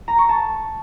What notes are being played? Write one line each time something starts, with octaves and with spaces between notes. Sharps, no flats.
A#5
C#6
A5